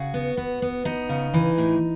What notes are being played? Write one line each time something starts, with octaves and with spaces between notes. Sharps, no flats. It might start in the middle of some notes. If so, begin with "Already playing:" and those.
Already playing: C#3 F#4
B3
B3
B3
B3 D#4
C#3
E3
A2